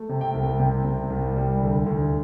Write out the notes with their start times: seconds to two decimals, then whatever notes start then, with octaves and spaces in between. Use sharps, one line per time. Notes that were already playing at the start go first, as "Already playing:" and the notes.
Already playing: A3
0.09 C3
0.21 G5
0.34 C2
0.59 C3 G5
0.84 C3
1.10 C2
1.36 G3
1.61 D2
1.86 D2